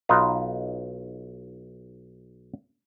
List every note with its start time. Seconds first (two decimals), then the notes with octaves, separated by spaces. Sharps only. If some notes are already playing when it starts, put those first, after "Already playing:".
0.09 B1 D#4 F4 B4